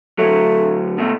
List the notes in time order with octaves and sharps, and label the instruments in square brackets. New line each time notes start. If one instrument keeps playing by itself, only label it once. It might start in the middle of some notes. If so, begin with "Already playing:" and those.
[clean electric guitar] D2 F#3 [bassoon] A3
[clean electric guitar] B2 A3